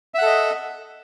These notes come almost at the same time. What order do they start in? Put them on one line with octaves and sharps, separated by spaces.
E5 F#5 A4 D#5